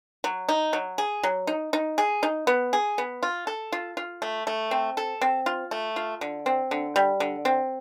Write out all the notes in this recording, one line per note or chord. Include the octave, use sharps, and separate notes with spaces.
F#3
D#4
F#3
G#4
F#3
D#4
D#4
G#4
D#4
B3
G#4
B3
F4
A4
F4
F4
A3
A3
C4
A4
C4
F4
A3
F4
D3
C4
D3
G3
D3
C4